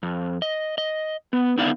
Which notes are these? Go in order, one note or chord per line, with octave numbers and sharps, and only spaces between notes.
F2
D#5
D#5
B3
D3 B3 D#4 E4 D5 F5